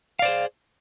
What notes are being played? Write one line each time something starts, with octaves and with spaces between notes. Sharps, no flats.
G#4 C5 D5 F5